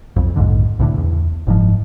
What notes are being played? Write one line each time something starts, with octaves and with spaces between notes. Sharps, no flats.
B1 F2
A#1 F2 G#2 D3
C2 A2 D3
E2
F#1 G#2 F3